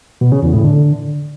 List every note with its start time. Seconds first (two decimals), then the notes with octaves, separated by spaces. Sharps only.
0.21 B2
0.32 C#3
0.43 E2
0.53 A2
0.64 D3